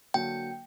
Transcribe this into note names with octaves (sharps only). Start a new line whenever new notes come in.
D3 F#3 A#3 G5